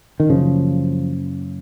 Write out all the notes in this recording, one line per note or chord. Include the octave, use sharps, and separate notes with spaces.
D#3
F#1 F#2 C#3 F3